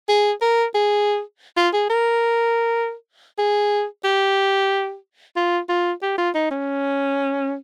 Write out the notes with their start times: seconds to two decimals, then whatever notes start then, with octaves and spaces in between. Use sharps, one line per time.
0.09 G#4
0.42 A#4
0.75 G#4
1.57 F4
1.74 G#4
1.90 A#4
3.38 G#4
4.04 G4
5.36 F4
5.69 F4
6.02 G4
6.18 F4
6.35 D#4
6.51 C#4